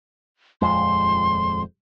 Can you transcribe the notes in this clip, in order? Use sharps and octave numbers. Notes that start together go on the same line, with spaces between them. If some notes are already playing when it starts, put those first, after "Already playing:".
D#1 F2 G#3 C6